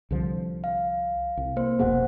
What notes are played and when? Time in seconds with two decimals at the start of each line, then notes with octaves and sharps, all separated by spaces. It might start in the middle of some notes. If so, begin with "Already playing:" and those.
0.11 C2 D3 F3
0.64 F5
1.37 C2
1.56 A#3 C5
1.79 F1 B2 B3 G#4 F#5